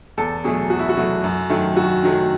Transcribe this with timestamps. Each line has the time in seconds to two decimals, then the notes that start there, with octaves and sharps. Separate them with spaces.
0.18 E2 A4
0.44 B2 F#3 A3 G#4
0.70 E2 F#4
0.79 E4
0.89 F#4
0.97 B2 F#3 A3
1.24 F#2
1.50 D#3 F#3 A3
1.76 F#2 F#4
2.03 D#3 F#3 A3